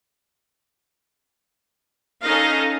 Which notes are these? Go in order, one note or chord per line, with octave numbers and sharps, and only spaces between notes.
C#4 D#4 A4 D#5 F5